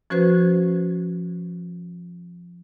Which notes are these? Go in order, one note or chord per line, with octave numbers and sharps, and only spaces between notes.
F3 C#4 F#4 B4 C5 G#6